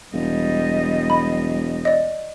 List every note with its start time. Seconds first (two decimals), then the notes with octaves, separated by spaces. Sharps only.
0.14 E1 G3 D#5
1.10 B5
1.85 D5 D#5